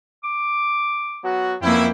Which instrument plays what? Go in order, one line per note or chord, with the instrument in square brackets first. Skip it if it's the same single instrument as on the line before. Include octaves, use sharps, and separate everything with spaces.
[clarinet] D6
[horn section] F#3 B3 F#4
[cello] F2 A#3 [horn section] B3 C#4 E4 [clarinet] G5